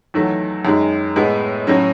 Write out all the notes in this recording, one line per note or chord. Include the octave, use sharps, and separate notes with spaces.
E2 D#3 F#3 A3
F#2 D#3 G#3
A2 G#3 B3
A2 F#3 C#4